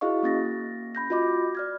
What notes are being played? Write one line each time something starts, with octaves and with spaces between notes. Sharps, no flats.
E4 F#4 G#4 D#5 F5 C#6
A#3 C#4 A6 A#6
B5 G6 A#6
F4 F#4 D#5 B5 D6
D5 F6 G#6